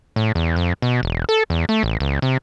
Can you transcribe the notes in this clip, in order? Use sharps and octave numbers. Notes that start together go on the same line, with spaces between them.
A2
E2
F2
B2
E1
A4
E2
A3
A1
C#2
C3